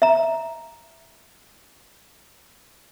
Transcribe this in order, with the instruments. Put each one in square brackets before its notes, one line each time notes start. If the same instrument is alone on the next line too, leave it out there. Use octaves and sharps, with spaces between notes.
[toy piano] E5 A#5